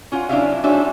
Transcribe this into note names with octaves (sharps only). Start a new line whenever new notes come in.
C#4 F4 F#5
F#3 D4 E4 G#4 E5 F5
G#3 D4 D#4 F#4 C#5 E5